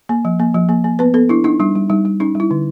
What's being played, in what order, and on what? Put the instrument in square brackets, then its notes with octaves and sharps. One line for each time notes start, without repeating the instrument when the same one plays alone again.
[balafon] A#3
F3
A#3
F3
A#3
A#3
B3 B4
B3 A4
D4 E4
D4 D#4
G3 D4
G3
G3 D#4
G3
C#4 D#4
G3
E4
D3